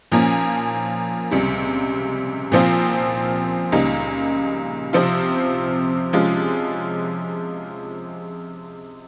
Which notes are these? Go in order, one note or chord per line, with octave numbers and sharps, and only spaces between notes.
A#2 F3 A#3 C#4
C#2 C3 G3
A#2 F3 C4 F4
C#2 C#3 G3 A#3 D#4
C3 F3 C4 F4
C3 F3 G#3 C#4 F4